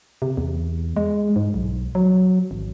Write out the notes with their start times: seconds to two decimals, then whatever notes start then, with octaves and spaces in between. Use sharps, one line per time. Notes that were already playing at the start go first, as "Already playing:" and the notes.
0.22 C3
0.37 E2
0.96 G#3
1.36 G#2
1.54 B1
1.95 F#3
2.51 G#1